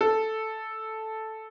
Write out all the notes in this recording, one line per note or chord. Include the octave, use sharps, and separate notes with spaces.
A4